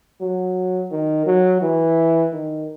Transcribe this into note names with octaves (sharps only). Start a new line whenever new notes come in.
F#3
D#3
F#3
E3
D#3